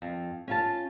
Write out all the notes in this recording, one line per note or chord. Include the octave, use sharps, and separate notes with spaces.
F2
C#4 F4 A5